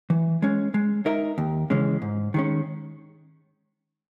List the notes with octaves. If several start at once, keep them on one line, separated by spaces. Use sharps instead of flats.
E3
G#3 C#4
G#3
D#4 A#4 E5
D#2
C#3 E3 G#3 C#4
G#2
D#3 G#3 C#4